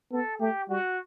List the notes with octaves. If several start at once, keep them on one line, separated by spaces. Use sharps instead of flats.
B3 A4
A3 G4
G3 F#4